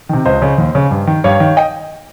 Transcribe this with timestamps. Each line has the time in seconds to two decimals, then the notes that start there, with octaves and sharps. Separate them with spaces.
0.09 C3 D#3
0.25 C#2 C5 D#5
0.42 C#3
0.58 D#2
0.75 C#3
0.91 G2
1.07 D#3
1.24 G2 C#5 F5
1.40 D#3
1.57 D#5 G5